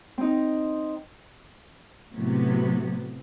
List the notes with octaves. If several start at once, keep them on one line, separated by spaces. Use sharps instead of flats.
C4 D#4
A2 C3 F#3 B3